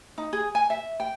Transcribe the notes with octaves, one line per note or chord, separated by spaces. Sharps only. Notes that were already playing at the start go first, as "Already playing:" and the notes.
D#4
G#4
G#5
E5
G5